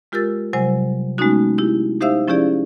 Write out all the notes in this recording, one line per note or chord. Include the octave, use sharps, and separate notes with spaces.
G#3 F4 G4 A#4 E6 A6
C3 F#3 G3 C5 G#5
G#3 A3 B3 C#4 D#4 F#4
E4 G4
D#4 G4 C5 E5 F5 E6
F3 C#4 E4 G4 G#4 D5